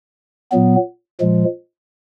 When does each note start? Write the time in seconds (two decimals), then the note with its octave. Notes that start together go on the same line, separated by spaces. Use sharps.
0.52 A#2 F#3 B3
1.20 A#2 F3 G#3